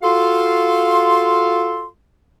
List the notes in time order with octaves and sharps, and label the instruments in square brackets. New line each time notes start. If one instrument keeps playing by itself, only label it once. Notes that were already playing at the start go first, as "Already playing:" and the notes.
[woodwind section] F4 F#4 A4 F5 C6